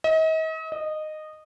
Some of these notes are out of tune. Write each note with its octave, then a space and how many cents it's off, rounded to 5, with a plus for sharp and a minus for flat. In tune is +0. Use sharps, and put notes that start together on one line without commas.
D#5 +40
D#5 -15